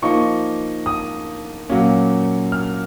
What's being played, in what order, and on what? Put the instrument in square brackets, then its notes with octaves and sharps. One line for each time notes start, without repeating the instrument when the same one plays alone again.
[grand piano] F3 A#3 D#4 C#6
D#6
A#2 F#3 A#3 C#4
F6